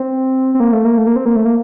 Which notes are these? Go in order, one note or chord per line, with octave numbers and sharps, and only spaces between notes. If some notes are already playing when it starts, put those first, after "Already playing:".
Already playing: C4
C4
A#3
A3
A#3
A3
A#3
C4
A#3
A3
A#3